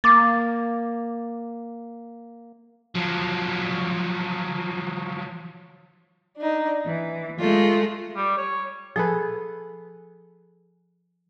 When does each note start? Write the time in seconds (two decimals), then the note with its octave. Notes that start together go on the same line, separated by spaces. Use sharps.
0.04 A#3 D6 A6
2.95 F3 F#3
6.38 D4 D#4
6.87 E3
7.39 G#3 A3 F4
8.16 G3
8.37 C#5
8.96 F3 G#4 A4 B4